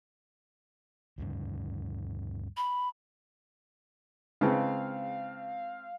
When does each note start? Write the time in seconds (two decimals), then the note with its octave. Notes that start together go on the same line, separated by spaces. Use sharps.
1.18 D2 G2 C#3
2.57 B5
4.41 C#3 G#3 C4 E4 B4 F5 A5